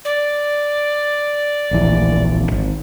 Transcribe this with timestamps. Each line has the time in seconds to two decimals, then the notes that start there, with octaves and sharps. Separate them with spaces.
0.05 D5
1.71 D1 A#1 E3
2.51 G#1